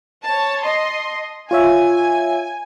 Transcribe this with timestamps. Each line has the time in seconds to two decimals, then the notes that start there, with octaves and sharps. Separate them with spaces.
0.23 C#5 A5
0.63 D#5 A5 C6
1.51 F4 C#5 E5 G#5